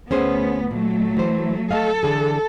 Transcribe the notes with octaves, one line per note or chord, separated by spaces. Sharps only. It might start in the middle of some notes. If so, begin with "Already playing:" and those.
D2 B3 C#4 G#4 C5
A#2 F#3 A3
E3 C5
A3 A4 D#5 F5
D3 E3 G#4